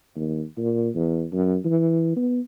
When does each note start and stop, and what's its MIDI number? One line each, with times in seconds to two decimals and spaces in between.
0.15 0.43 39
0.58 0.88 46
0.95 1.25 40
1.32 1.57 42
1.65 2.15 52
2.16 2.40 59